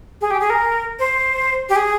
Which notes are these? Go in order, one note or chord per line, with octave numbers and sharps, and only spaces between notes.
G#4
G4
G#4
A#4
C5
G4
G#4